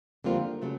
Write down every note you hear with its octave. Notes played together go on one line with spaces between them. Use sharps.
F2 D3 G3 A#3 C4 F4
C#3 F#3 A3